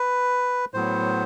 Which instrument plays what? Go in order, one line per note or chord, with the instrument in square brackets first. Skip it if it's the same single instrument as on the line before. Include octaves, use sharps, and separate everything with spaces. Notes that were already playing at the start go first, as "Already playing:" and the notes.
Already playing: [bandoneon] B4
A2 F#3 B3 C5